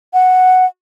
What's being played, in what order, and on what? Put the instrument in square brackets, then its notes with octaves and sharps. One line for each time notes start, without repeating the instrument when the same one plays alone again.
[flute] F#5